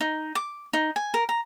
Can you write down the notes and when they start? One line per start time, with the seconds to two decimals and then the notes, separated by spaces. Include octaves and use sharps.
0.01 D#4
0.35 D6
0.73 D#4
0.96 G#5
1.14 A#4
1.29 A#5